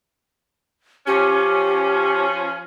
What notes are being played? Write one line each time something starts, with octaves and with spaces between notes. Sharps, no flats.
F3 C#4 G4